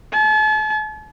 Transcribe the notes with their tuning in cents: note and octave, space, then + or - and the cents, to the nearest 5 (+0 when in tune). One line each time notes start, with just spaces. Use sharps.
A5 -40